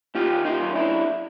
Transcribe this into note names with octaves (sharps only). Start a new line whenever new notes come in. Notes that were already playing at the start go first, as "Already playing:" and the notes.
D#3 F4 G4
D#4 F4
F#2
D4 E4